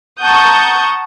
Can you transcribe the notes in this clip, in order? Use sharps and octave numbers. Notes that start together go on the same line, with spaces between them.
F#5 A5 A#5 C#6 D#6 G6